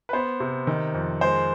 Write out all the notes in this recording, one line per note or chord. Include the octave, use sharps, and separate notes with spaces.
B4
B3 C5
C3
D#3
F2
G#3 C5